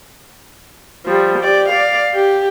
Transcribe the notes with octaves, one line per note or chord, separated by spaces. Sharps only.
F3 G3
G4 D5
D5 F5
G4